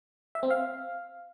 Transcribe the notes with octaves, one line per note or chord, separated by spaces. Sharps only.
E5
C4
F5